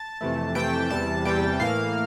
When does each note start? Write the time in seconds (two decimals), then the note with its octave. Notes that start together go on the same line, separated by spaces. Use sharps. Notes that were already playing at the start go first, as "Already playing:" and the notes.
Already playing: A5
0.21 F2 C3 E3 A3
0.55 F2 C3 E3 A3 G5
0.90 E2 C3 E3 G3 A5
1.25 E2 C3 E3 G3 G5
1.60 A2 E3 A#3 F5